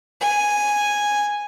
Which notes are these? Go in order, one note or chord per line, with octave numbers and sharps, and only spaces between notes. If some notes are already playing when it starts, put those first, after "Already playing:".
G#5